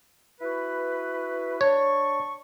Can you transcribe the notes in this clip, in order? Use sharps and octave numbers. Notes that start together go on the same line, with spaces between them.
E4 F#4 B4
D4 C#5 A5 C#6